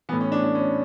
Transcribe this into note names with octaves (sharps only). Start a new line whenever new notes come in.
A2 E3 B3
C#4
D4
D4
C#4